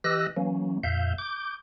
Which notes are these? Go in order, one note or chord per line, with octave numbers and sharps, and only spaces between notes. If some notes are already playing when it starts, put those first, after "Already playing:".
E3 G4 D#5 E6 F#6 A#6
E3 F#3 A#3 C#4
F2 A#2 E5 F5 G6
D6 G6